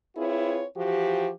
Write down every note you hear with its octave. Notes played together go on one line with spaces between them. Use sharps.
C4 E4 F4 G#4 B4 C#5
E3 F3 F#4 G4